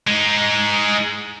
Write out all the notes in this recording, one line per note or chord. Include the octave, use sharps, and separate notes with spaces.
G#3 D#4